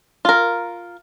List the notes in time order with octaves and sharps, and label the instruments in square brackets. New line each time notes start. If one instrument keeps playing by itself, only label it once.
[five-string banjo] F4 A#4